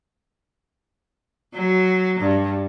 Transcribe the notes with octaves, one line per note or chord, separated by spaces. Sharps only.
F#3
G2